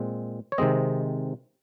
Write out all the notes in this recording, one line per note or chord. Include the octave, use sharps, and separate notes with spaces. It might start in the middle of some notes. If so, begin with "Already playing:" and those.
Already playing: A#2 G#3 C4
C#5
C3 D#3 G#3 C4 D#5